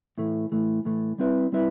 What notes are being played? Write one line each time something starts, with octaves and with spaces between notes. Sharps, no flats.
A2 E3 A3
A2 E3 A3
A2 E3 A3
G3 C4 E4 B4 E5
G3 C4 E4 B4 E5